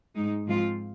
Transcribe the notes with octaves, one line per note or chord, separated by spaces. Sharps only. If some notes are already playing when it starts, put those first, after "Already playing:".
G#2 G#3 D#4
G#2 F3 G#3 C4 F4